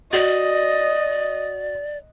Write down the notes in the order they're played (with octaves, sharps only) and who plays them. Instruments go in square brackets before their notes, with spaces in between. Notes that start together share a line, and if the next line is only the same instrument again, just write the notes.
[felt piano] F#4 [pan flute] D5 [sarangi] D#5